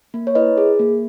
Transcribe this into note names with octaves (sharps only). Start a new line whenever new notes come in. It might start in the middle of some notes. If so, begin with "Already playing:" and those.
A#3
C#5
E4 B4 D#5
G#4
A#3